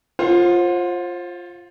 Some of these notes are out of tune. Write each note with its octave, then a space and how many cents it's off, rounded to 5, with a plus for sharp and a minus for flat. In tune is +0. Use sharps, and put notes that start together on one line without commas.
F4 +0 C5 +30 F#5 -40